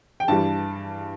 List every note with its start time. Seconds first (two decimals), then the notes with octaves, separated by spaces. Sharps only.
0.20 G5
0.28 G2 E3 G3 A5